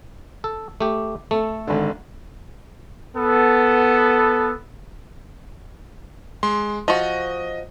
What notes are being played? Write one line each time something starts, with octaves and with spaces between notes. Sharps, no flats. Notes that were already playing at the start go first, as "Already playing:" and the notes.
A4
A3 G4
A3 A4
G#1 D3
B3 A4
G#3 C6
F3 F#4 D#5